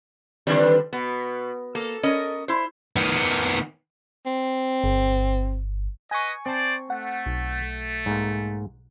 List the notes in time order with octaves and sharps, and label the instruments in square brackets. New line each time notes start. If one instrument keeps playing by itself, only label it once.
[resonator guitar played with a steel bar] D3 G3 [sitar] D#3 C4 D4
[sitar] B2 [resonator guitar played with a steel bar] B3
[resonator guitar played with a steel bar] A#3 [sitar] A4
[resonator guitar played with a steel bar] C#4 A#4 D#5
E4 C5
[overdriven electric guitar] D#3 B3
[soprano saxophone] C4
[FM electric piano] G1
[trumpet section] B4 D#5 [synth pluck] G#5 C#6
[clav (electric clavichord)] C4 A5 [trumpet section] C5 D5
[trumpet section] A3 [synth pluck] F#5
[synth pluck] B1
[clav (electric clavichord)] G#2 A#3